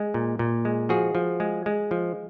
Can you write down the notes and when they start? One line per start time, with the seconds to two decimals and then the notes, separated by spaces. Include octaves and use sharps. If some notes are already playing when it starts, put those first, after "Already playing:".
Already playing: G#3
0.14 A#2
0.39 A#2
0.65 G#3
0.89 F3 F#4 G#4
1.15 F3
1.40 G#3
1.66 G#3
1.91 F3